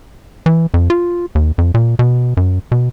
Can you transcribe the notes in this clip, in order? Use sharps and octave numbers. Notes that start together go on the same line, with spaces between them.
E3
F2
F4
D#2
F2
A#2
B2
F#2
B2